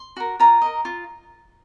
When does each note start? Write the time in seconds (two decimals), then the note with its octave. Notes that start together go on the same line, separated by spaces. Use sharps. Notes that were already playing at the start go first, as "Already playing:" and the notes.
Already playing: C6
0.17 F#4 A#4
0.40 F4 A#5
0.62 A#4 D#5
0.85 F4